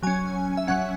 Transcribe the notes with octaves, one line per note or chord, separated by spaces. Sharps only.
F#3 C#4 G#5
E5
F#3 C#4 F#5